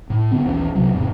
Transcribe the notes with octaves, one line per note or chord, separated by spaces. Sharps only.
A2
D3 B3 C4
A#1 D#2 E3 C#4
C2 C3 F#3
E2 G#2 C3 E3